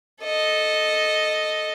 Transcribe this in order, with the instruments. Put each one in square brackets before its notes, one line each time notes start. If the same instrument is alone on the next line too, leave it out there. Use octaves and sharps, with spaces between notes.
[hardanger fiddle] A4 D#5